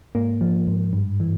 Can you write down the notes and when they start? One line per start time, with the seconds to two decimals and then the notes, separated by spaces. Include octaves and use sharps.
0.15 G#2 A#3
0.41 F3
0.67 G#2
0.93 G2
1.20 E3